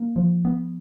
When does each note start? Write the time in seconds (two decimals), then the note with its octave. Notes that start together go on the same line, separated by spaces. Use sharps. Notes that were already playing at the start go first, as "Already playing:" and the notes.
Already playing: A#3
0.16 F3
0.45 B3